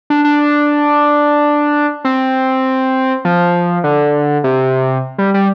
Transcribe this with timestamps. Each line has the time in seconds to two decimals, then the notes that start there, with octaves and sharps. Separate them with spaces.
0.10 D4
0.25 D4
2.05 C4
3.25 F3
3.84 D3
4.44 C3
5.18 G3
5.34 G3